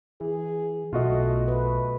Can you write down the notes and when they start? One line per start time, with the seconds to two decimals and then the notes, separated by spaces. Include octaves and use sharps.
0.21 E3 G#4
0.93 B1 B2 A3 F4 F#4 D#5
1.48 A3 B4